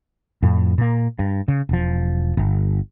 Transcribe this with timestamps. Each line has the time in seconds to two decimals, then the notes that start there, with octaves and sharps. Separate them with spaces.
0.42 F2 A2
0.78 A#2 A#3
1.19 G2
1.48 C#3
1.69 E1 F3
2.37 G1